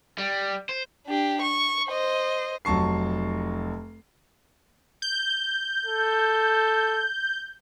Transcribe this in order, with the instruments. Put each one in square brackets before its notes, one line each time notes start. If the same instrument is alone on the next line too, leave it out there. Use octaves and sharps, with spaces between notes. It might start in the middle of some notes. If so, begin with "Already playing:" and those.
[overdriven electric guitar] G3
C5
[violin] D4 G4
C#6
C5 D#5
[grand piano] F1 F#3 A5 C#6 C7
[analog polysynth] G6
[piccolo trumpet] A4